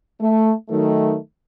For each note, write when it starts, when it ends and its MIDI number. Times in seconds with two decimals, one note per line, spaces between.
0.21 0.52 57
0.69 1.16 51
0.69 1.16 54
0.69 1.16 57